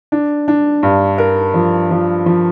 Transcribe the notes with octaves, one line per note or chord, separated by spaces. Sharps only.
D4
D4
G2
A#4
F3
F3
F3